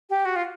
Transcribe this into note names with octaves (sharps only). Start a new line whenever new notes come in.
G4
F#4
F4